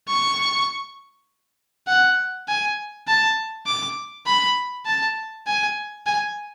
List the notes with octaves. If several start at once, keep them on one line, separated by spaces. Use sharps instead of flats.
C#6
F#5
G#5
A5
D6
B5
A5
G#5
G#5